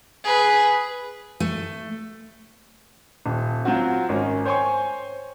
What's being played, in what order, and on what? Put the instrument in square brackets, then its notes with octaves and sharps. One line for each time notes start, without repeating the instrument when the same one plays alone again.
[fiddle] G#4 B4
[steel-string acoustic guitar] A3
[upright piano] D#1
F#3 C4 F4 F#4
G#1 C#4 A#4
C5 C#5 G5 G#5 C6 C#6